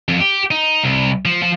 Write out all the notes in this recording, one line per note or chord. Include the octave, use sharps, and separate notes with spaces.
F2
G4
D#4
C2
F3
F3